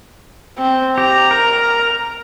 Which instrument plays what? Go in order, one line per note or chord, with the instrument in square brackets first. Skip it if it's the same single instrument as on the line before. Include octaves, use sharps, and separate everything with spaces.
[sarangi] C4
[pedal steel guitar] G4 [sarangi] A#5
[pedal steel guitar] A#4